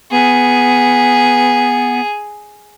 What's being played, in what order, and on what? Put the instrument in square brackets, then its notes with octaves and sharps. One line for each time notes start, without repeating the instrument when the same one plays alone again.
[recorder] B3 [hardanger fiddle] G#4